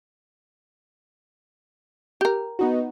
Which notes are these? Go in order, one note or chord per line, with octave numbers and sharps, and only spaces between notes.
G4 A#4
B3 D#4 F#4